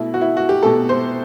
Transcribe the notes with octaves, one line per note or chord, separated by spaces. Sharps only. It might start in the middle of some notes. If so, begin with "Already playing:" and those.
Already playing: B2 A3 E4
F#4
E4
F#4
G4
B2 A3 A4
C5